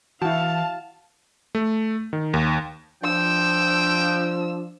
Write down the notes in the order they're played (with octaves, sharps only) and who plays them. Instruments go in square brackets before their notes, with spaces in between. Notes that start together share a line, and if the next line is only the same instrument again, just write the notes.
[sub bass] E3 [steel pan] E4 F#4 [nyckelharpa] F5 [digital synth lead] A5
[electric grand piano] A3
D#3
D#2
[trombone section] F3 [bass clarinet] D4 [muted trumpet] G5 [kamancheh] E6